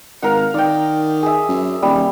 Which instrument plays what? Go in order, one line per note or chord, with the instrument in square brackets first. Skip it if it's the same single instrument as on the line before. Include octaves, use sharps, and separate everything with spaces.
[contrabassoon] G#1 [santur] A#4 F5 F#5
[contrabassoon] D#3 [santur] D5 G5
[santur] G#4 E5
[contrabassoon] F#2
[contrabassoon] D#1 [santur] G3